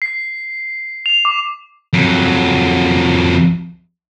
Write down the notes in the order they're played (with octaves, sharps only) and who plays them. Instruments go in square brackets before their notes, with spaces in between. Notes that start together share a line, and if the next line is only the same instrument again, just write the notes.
[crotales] C7
F7
D6
[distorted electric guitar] F2 F#3